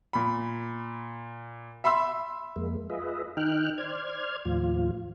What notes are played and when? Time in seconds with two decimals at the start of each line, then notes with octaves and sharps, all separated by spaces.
0.13 A#2 B5
1.84 E5 B5 C6 E6
2.56 F2 G#3 A#3
2.90 F4 G#4 B4 D#5 E5
3.37 D#3 D#4 G5 F6 F#6
3.78 C5 D5 F6 G#6
4.45 D#2 A2 F3 F4